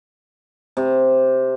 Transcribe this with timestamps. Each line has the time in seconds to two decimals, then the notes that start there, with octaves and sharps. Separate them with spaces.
0.77 C3